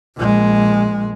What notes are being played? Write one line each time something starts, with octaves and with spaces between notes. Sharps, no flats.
A#1 G#3